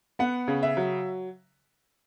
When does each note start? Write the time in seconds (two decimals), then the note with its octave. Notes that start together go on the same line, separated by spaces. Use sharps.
0.19 B3 F#5
0.48 C#3
0.63 E5
0.77 F#3